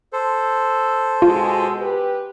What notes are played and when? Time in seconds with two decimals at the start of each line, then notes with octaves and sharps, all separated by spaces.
0.13 A4 C5
1.22 B2 G#3 F4
1.79 G4 B4